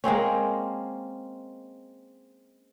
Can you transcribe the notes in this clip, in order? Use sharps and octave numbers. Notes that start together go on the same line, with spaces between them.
G#3 A#3 C4 C#4